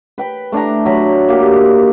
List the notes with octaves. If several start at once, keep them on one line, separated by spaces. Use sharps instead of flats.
B4 G5 B5
A3 D4 E4 A#5
F#3 A#5 B5
A#3 G4